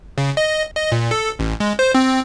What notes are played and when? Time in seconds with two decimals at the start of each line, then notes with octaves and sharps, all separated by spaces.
0.18 C#3
0.37 D#5
0.76 D#5
0.92 A#2
1.11 A4
1.39 A1
1.60 G#3
1.79 C5
1.94 C4